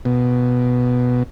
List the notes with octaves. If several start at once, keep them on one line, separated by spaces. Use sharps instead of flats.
B2